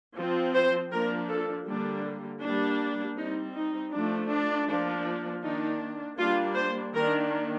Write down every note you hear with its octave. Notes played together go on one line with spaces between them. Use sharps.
F3 C4
C5
F3 A#3 D4 A#4
A4
D3 G3 A#3 D4
G3 A#3 D4
G3 C4 D#4
D#4
F3 A3 D4
D4
F3 A#3 D4
D#3 A#3 D4 D#4
G3 A#3 D4 F4
C5
D#3 A#3 D4 A#4